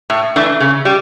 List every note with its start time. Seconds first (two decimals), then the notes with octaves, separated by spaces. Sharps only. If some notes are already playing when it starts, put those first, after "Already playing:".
0.10 A2
0.36 E3 A3 D4
0.60 C#3
0.85 G3